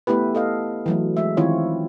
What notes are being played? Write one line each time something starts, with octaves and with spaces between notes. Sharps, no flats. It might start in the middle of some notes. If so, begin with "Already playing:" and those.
A3 B3 E4 G4 B4
A4 D#5 F5
E3 F#3 A3
G#3 E5
D#3 E3 C4 E4 F4 C#5